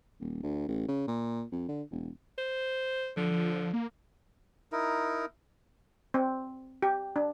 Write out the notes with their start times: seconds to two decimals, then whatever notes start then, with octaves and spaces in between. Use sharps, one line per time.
0.20 D#1
0.43 D2
0.68 A1
0.88 C#3
1.07 A#2
1.52 F2
1.68 D3
1.91 E1
2.38 C5
3.17 D3 F3
3.31 F3
3.74 A#3
4.72 D#4 E4 A#4
6.14 C4
6.83 G4
7.16 D4